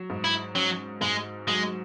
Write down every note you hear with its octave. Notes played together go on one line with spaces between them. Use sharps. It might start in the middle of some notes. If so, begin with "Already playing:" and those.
Already playing: F#3
G#2
E4
F#3 C#4
G#2 G#3
F#3 G#3